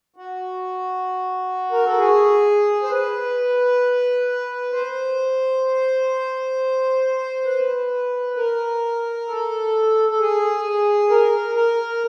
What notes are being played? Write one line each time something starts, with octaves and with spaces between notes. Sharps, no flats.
F#4
A#4
A4
G#4
C5
B4
C5
B4
A#4
A4
A4
G#4
A#4
A#4